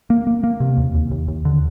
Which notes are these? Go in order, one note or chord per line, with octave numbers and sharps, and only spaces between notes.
A#3
A#3
A#3
C3
D#2
D#2
D#2
D#2
D3